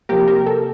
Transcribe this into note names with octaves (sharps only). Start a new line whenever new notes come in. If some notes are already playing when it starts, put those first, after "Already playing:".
C3 F3 A#3 G4 A#4
G4 A#4
A4